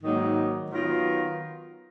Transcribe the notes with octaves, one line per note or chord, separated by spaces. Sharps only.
G#2 D#3 F#3 A#3 D#4
D#3 F#3 B3 F4 A#4